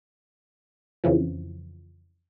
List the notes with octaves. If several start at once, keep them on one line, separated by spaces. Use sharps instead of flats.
F2 C#3 E3 F3